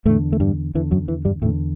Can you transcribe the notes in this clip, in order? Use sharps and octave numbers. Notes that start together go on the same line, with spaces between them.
E2 A2 D3 A3
A3
G2 G3
E2 D3 E3
F#2 F#3
E3
G2 G3
E2 A2 D3 A3